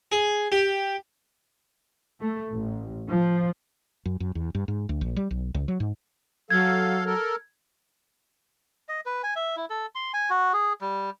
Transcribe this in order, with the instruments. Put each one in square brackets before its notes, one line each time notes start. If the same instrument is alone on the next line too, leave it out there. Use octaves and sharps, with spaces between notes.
[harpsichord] G#4
G4
[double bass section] A3
A1
F3
[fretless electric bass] F#2
F#2
E2
G2
G#2
D2
A#1
G3
B1
C#2
F#3
G#2
[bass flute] F#3 [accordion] A4 F5 [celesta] G#6
[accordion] A4 A#4
[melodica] D#5
B4
G#5
E5
E4
A4
C6
G#5
F#4
G#4
G3